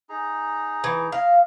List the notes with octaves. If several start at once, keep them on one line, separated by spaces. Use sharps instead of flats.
D#4 G#4 A#5
E3
D#5 F5